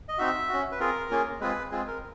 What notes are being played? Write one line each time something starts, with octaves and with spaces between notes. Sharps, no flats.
D#5
C4 D#4 F#4 E5
C#4 F#4
B4
C4 F4 G#4 A#4
A#3 C#4 F4 G#4
G#3 C4 F4 G#4 B4
G#3 C4 F4 G#4
A#4